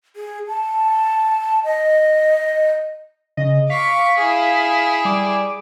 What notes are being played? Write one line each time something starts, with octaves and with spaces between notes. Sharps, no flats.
G#4
A5
D#5
C#3 D#5
F5 C#6 D6 B6
E4 G#4
G3 D6